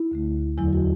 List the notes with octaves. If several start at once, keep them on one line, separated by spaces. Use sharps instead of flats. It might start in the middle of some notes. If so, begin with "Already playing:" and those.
Already playing: E4
D2 D3 A3
E2 D3 F#3 E4
F#4